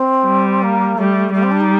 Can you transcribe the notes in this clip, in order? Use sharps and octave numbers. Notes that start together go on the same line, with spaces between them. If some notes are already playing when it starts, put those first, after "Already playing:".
Already playing: C4
G3
A#3
G3 A3
G3 A3
C4
D4
D#4